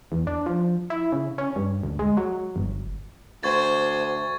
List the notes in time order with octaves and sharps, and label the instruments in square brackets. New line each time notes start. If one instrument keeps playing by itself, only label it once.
[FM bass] E2
D4
F3
E4
C#3
C#4
G2
D2
G#3
F#3
G1
[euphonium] D2 [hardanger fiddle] C5 [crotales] C#6 G#6 A6